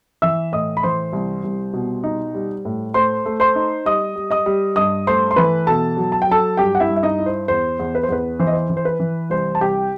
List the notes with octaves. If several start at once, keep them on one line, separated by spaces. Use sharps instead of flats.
E3 E5 E6
A2 D#5 D#6
B5
E3 C5 C6
C2
C2
B2
D#4
G3
A2
A3 C5 C6
A3
C5 C6
D#4
G3 D#5 D#6
G3
D#5 D#6
G3
G2 D#5 D#6
A3 C5 C6
C6
E3 B4 B5
B2 A4 A5
F#3
A5
G5
F#3 A4 A5
G2 G4 G5
F#5
E4 E5
G2
E5
D#4 D#5
E4
C5
E2 C5
E2
B4
C5
E2 B4
E3 C5
D#5
C5
E3
C5
B4
E3
C2 C5
A5
C2 G4 G5